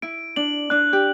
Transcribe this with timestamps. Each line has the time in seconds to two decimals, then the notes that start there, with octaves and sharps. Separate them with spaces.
0.02 E4 D7
0.36 D4 F#7
0.70 D4 F#6
0.93 G4